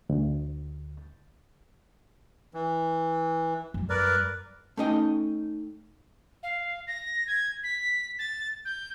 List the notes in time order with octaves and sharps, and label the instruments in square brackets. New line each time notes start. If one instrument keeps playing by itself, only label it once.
[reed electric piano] D2
[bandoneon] E3
[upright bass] F#2 G3
[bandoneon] A#4 B4 D5
[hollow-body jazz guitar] A3 C#4 D#4 D#5 G5
[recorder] F5
A#6
G#6
B6
A6
G6